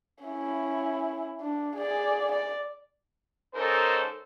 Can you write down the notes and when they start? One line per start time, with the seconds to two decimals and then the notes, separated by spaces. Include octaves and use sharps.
0.25 C#4 E4
1.41 D4
1.77 G#4 D5
2.32 D5
3.54 G#2 C#4 D#4 A4 A#4 C5